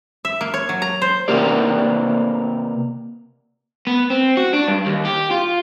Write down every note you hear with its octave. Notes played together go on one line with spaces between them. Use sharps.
E5
A#3
C#5
F#3
A#5
C5
C3 A#3 G4 A#4 D5
B3
C4
F#4
D4
G2
D#2
G4
F4